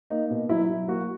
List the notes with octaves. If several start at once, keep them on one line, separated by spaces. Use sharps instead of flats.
A#3 D#4
B2
F#3 E4
F#3
A#3 F#4